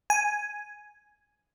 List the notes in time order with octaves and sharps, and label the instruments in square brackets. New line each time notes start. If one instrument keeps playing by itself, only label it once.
[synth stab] G#5